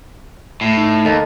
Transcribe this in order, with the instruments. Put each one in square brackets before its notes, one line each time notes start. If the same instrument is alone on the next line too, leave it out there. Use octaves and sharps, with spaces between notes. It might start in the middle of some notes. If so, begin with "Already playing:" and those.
[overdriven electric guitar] A2
[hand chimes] D#4
[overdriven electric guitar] D#2 [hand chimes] A4 D#5 A5